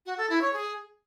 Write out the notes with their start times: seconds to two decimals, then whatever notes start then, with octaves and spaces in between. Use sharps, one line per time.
0.06 F#4
0.18 A4
0.30 E4
0.41 C#5
0.53 G#4